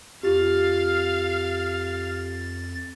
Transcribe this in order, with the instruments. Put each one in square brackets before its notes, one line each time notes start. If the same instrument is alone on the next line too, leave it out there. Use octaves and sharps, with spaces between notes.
[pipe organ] F2 A6 [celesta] F4 G4 [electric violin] F5 F6